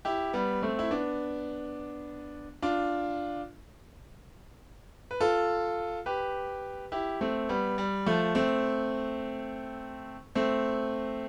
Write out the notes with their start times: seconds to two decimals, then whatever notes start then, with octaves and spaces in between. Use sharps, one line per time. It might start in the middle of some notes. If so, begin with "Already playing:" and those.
0.05 E4 G4
0.33 G3 B3
0.63 A3 C4
0.79 E4
0.91 B3 D4
2.62 D4 F4
5.11 B4
5.21 F4 A4
6.06 G4 B4
6.92 E4 G4
7.21 A3 C4
7.49 G3 B3
7.78 G3
8.06 F3 A3
8.35 A3 C4
10.35 A3 C4